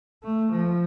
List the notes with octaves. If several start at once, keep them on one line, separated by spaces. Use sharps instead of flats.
A3
F3